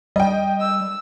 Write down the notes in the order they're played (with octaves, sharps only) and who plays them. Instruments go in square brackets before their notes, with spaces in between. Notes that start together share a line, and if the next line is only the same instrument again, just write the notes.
[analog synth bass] G3 [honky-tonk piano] D#5 G5
[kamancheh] E6